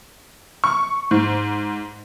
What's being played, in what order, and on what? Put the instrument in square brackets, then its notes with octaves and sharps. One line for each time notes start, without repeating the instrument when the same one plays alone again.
[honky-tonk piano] C#6
G#2